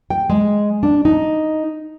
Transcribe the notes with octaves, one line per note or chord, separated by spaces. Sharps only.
G5
G#3
D4
D#4